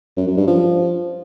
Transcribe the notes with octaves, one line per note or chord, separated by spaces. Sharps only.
F#2
F#2
G2
F3